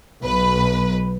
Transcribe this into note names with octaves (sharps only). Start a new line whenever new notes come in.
B1 B4